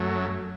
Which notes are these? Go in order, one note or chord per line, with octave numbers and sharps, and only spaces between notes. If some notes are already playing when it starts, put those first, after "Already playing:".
Already playing: F#2 F#3 A3